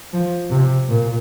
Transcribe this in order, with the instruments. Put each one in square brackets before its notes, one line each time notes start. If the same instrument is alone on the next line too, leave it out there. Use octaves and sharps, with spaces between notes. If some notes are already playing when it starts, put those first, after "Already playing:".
[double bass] F3
C3
A#2